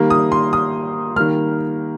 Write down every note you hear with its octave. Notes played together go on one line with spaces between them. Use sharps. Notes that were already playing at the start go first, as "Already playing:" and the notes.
Already playing: D#3 G3 A#3
D#6
C6
D#6
D#3 G3 A#3 F6